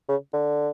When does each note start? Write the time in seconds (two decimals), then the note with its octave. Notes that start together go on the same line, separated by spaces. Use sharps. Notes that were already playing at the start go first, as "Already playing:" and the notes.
0.08 C#3
0.33 D3